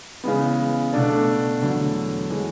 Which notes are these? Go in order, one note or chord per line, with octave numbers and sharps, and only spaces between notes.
C#3 E3 G#3 B3
B2 A3 D4 A4 D5
E2 D3 F#3 A3
E3 G#3